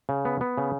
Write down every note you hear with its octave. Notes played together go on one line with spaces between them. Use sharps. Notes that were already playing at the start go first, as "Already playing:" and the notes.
C#3
B3
B3
C#3